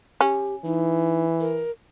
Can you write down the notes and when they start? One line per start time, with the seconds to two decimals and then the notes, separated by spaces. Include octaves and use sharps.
0.21 C#4 G4
0.65 E3 D#4
1.40 A#4